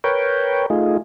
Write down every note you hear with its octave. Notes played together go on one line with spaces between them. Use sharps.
A#4 B4 C#5 G5
A3 D#4 F4 G#4